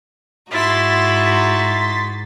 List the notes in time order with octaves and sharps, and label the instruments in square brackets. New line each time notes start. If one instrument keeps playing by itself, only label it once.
[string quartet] G#2 [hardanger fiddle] D#4 F#4 [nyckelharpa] E4 [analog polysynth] C6 A6 B6